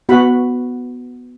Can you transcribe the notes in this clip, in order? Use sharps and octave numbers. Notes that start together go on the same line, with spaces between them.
B3 F#4 F#5 B5